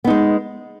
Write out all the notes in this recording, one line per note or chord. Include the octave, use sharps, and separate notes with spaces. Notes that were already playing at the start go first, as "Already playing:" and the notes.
G#3 B3 D#4